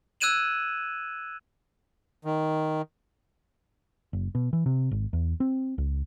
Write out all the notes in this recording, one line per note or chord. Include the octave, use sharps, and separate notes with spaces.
E6 F#6 G#6 D#7 E7 F#7
D#3
F#1
B2
E3
C3
G#1
E2
C4
C#2